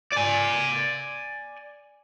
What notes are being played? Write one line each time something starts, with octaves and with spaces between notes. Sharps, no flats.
D5 G#5